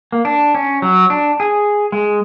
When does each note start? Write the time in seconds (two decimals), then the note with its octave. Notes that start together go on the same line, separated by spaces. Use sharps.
0.12 A#3
0.25 D4
0.55 C#4
0.82 F#3
1.10 D4
1.40 G#4
1.92 G#3